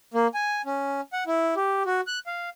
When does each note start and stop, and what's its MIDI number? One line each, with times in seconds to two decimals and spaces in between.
0.14 0.27 58
0.34 0.62 80
0.66 1.01 61
1.13 1.24 78
1.27 1.55 64
1.56 1.83 67
1.86 2.01 66
2.07 2.19 90
2.27 2.50 77